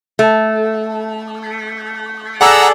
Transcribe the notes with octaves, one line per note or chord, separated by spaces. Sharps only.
A3
G#4 A4 D5 F#5 A#5 E6